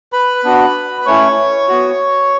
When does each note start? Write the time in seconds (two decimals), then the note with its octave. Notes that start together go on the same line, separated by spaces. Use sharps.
0.13 B4 B5
0.44 B3 D4 F#4
1.01 B5
1.06 A3 C#4 E4 C#5 C#6
1.68 B3 F#4